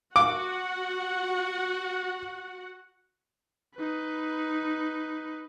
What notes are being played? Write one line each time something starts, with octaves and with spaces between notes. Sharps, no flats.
F#4 F#5 D6
D#4 B4